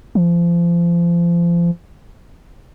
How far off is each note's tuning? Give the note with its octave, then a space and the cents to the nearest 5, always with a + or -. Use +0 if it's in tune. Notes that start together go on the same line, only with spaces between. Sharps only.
F3 -30